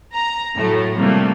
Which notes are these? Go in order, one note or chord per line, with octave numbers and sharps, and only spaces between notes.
A#5
A2 F#3 A3
C3 G3 A3 A#3